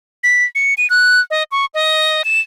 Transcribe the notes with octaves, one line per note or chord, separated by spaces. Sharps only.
B6
C#7
D#7
F#6
D#5
C#6
D#5
E7